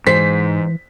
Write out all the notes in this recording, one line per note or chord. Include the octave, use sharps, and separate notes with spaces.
G#2 E3 C5 B6